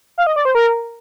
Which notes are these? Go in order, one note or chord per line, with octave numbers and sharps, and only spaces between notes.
F5
D#5
D5
C5
A#4